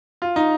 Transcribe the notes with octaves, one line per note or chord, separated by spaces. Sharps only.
F4
D#4